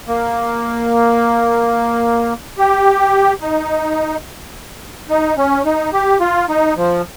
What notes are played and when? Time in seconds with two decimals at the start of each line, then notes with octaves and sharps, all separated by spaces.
0.08 A#3
2.58 G4
3.41 D#4
5.10 D#4
5.37 C#4
5.65 D#4
5.93 G4
6.20 F4
6.49 D#4
6.77 F3